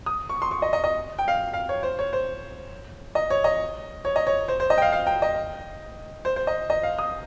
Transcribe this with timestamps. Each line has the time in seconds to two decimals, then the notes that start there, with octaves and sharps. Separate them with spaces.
0.06 D#6
0.29 C#6
0.42 C6
0.51 C#6
0.62 D#5
0.73 D#5
0.84 D#5
1.19 G5
1.28 F5
1.53 F5
1.69 C#5
1.83 C5
1.99 C#5
2.13 C5
3.15 D#5
3.30 C#5
3.44 D#5
4.05 C#5
4.16 D#5
4.27 C#5
4.48 C5
4.60 C5
4.70 D#5
4.78 G5
4.82 F5
4.92 F5
5.07 G5
5.22 D#5
6.25 C5
6.36 C5
6.47 D#5
6.70 D#5
6.83 F5
6.99 D#6